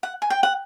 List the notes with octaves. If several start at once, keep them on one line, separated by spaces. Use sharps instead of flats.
F#5
G#5
G5
F#5